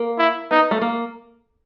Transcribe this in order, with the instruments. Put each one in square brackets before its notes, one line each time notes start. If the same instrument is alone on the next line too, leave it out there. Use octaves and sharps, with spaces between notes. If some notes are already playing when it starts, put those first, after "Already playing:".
Already playing: [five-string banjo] A#3
[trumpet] E4
[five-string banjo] B3 [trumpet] D#4
[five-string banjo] A3
A#3